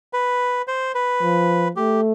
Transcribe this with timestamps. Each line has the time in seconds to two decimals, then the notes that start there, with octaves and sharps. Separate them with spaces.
0.13 B4
0.68 C5
0.95 B4
1.22 F3
1.76 A3 G4